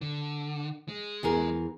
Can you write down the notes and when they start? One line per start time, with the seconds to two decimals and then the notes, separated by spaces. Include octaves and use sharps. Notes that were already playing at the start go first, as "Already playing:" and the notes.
0.01 D3
0.88 G#3
1.23 E2 G#4 A#4